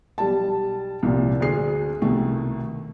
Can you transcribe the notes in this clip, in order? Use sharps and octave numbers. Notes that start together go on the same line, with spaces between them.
B1 G3 A5
C2 A#2
D2 D4 G#4 C7
C2 B2 D#3 A3